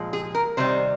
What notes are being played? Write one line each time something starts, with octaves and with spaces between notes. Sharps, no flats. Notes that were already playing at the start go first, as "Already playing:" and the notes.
Already playing: A#2 F3 G#3
G#4
A#4
C3 D#3 G3 C5